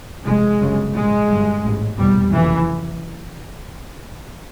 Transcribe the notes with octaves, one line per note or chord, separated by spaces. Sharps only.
F1 F2 C3 G#3
G1 F#2 C#3
A#1 G#2 G#3
G1 G2
A1 G#2
F1 E2 B2 G3
F#1 F2 C3 E3